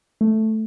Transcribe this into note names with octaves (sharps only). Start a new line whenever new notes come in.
A3